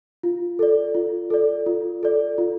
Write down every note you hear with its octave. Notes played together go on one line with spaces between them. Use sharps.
F4
A4 D5
F4
A4 D5
F4
A4 D5
F4